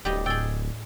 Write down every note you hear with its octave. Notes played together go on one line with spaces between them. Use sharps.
D1 G3 G4 D#5
A2 G#4 G5 E6 A6